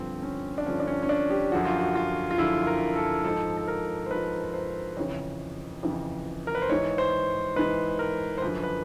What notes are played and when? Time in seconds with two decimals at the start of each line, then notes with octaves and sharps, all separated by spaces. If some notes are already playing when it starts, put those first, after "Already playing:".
Already playing: G2 D3 F3 C4
0.23 C#4
0.58 D4
0.66 G2 D3 F3 C#4
0.80 D4
0.87 C#4
1.03 C#4
1.09 D4
1.30 G4
1.52 F#2 D3 F3 F#4
1.65 F4
1.78 F#4
1.95 F4
2.31 F4
2.38 F#2 D3 F3 E4
2.67 A#4
2.96 A4
3.24 G#2 F3 A4
3.57 A4
3.68 A#4
4.06 C5
4.11 G#2 F3 B4
4.54 C5
4.97 F2 C#3 E3 C#5
5.83 F2 C#3 E3
6.47 A#4
6.55 B4
6.62 C5
6.69 G#2 E3 C#5
6.98 C5
7.56 G#2 E3 B4
7.99 A#4
8.38 C5
8.42 F#2 D3 F3 B4
8.63 B4